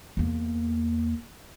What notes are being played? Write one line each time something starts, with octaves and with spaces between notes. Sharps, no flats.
E2 A#3